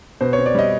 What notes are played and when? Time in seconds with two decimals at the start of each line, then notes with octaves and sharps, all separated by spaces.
0.21 B2 C5
0.33 C4 C#5
0.46 D5
0.55 G3 D#5